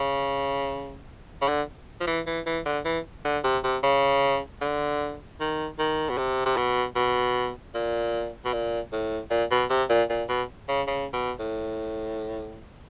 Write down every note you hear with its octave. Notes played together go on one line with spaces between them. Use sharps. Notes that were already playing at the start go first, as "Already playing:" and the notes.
Already playing: C#3
C#3
D3
F3
E3
E3
E3
D3
E3
D3
C3
C3
C#3
D3
D#3
D#3
B2
C3
C3
B2
B2
A#2
B2
A#2
A2
A#2
B2
C3
A#2
A#2
B2
C#3
C#3
B2
A2